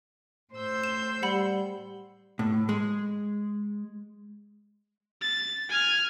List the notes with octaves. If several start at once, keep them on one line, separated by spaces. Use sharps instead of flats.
A2 C5 E6 G6
E7
G3 F#5 B5
A2
G#3
A6
G#5 F6